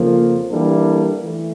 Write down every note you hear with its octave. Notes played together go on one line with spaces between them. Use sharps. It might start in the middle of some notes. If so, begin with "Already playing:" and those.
Already playing: F2 C#3 F3 A#3
E3 G3 A#3 D4 A4
E3 A3